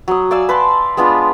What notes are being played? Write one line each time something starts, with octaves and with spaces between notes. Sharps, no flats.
F#3 D#6
D5 F5 G#5 E6
B4 A5 C6
G#3 B3 D4 F4